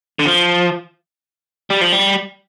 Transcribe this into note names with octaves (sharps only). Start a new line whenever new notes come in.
D3
F3
G3
F3
G3